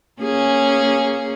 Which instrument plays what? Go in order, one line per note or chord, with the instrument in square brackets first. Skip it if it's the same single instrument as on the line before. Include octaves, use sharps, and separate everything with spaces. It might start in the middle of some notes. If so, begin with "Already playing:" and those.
[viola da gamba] A#3 C#4 G#4